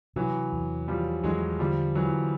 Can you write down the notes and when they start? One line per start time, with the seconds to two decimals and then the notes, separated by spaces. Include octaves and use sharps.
0.16 C3 E3 F#3
0.52 E2
0.88 E3 F3 G3
1.23 E2 F#3 G#3
1.59 D3 F3 G3
1.95 E3 F#3 B3